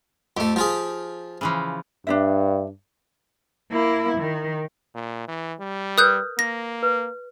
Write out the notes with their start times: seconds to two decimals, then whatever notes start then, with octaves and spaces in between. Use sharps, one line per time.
0.37 F2 A3 G4
0.56 F3 F4 G#4
1.41 C#3 E3 F3
2.07 G2 D4 D#4 E5
3.72 A#3 E4
4.18 D#3
4.95 A#2
5.28 E3
5.60 G3
5.98 A#4 B4 D#6 F#6 G6
6.39 A#3 A#6
6.83 B4